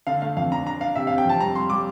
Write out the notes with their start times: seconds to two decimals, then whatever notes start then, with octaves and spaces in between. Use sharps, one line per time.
0.07 D3 F5
0.22 A3 F5
0.37 F2 F5
0.52 D4 A#5
0.66 D4 A#5
0.81 D4 F5
0.95 C3 E5
1.07 C3 F5
1.18 G5
1.25 F2 A5
1.40 G3 A#5
1.55 G3 C6
1.70 G3 D6